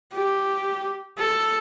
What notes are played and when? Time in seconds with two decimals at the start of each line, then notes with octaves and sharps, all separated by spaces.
0.13 G4
1.18 A4